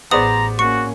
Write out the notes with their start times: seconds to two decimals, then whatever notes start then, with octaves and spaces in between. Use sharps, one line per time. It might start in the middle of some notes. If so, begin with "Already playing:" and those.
0.11 A1 B3 G#4 C5 D5 A#5 D#6
0.59 A#3 C#4 F#4 C#6 C#7